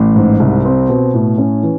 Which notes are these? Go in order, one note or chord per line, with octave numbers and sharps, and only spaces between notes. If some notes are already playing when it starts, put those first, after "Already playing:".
Already playing: A1
G#2
C2
C4
B2
A2
C#4
E3